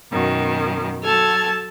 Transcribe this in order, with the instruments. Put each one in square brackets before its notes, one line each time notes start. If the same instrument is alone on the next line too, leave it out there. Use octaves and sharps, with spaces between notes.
[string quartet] F#2 B2 D#3
[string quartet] F#3 F6 G#6 [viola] A4 A5